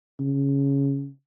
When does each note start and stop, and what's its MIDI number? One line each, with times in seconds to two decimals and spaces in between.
0.20 1.08 49